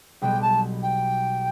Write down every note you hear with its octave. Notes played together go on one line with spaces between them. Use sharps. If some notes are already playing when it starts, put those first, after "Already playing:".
B1 B2 G3 B3 G5
A5
G5